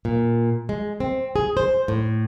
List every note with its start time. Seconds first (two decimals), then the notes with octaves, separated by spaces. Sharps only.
0.05 A#2
0.69 G#3
1.00 C4
1.36 G#4
1.57 C5
1.88 A2